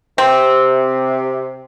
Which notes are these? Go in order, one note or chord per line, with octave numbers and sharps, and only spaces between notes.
C3 C4